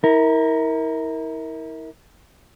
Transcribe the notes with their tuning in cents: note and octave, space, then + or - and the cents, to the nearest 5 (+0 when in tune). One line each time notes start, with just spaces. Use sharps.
E4 -35 A#4 +0